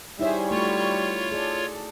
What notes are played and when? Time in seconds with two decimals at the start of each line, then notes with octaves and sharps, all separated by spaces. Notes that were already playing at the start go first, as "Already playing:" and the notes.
0.20 G3 D#4 E4 G#4 C5 C#5 E5
0.51 A3 F4 F#4 C#5 B5 C#6
1.32 G#4 A4 D5